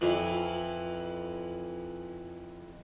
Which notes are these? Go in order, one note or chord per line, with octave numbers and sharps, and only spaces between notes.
F2 E3